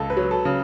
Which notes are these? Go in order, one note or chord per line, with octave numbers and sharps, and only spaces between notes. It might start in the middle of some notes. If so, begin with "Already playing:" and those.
Already playing: C#2 A4
B4
F#3
A4
C#3